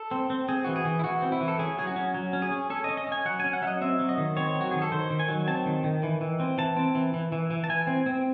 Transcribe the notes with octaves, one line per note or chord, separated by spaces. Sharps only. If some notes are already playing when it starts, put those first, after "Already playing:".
Already playing: A4
C4
C4
C4 G#4
E3 F#4
G#4
E3
E4
E3 F#4
C4
E4
E3
A4
C#4 G#4
F#3 G#4
F#4
C#4
F#3
C#4
G#4
C#4
C#4 A4
D#5
C#4
D#5
C#4
G#5
F#3 F#5
C#4 G#5
F#5
F#3 E5
D#5
C4 E5
F#3
D#5
D#3
C4 C#5
F#3
F#4
D#3 G#4
A4
D#3 C5
D#3
G#5
F#3
C4 A5
D#3
D#3
E3
E3
C4
E3 A5
C4
E3
E3
E3
E3
A5
E3 G#5
C4
C4